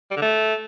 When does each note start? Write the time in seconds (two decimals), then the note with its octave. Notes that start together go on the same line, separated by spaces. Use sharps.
0.11 G3
0.16 D3
0.22 A3